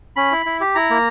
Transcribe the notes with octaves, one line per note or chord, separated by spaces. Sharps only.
C#4 B5
E4
E4
G4
E4 A#5
A#3